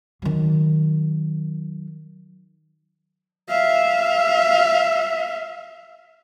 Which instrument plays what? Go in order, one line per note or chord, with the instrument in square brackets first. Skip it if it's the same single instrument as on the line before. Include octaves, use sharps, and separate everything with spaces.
[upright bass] D#3 F#3
[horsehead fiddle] E5 F5